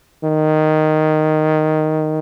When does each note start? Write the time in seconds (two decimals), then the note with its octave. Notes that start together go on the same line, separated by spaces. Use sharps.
0.24 D#3